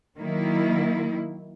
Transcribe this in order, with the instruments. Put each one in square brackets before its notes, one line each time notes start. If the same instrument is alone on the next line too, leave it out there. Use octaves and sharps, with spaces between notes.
[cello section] D#3 F#3 A#3 E4